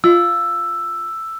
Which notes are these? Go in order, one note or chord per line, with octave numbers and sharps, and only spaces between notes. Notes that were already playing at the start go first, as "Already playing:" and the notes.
F4 E6